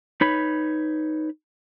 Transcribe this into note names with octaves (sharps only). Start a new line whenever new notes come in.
D#4 B4 C#5 B5